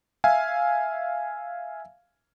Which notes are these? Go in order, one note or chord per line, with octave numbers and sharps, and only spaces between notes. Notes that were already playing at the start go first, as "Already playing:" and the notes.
E5 F5 G#5